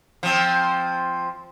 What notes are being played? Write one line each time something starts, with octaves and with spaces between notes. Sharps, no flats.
F3 C4